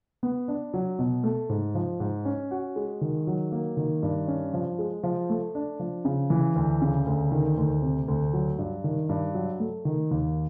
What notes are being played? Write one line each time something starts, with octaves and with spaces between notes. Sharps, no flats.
B3
D4
F#3
B2
A3
G#2
F3
G#2
C#4
F#4
G#3
D#3
F#3
A#3
D#3
G2
C#4
F3
G#3
F3
A3
D4
F3
C#3
E3
D2
C#3
D2
D#3
D2
C3
D2
F#3
G2
D#3
G2
F#3
A3
D#3
D#2